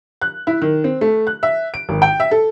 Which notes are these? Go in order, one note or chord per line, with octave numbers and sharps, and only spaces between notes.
F#6
E4
D#3
C4
A3
F#6
E5
D7
G#1
G5
E5
A4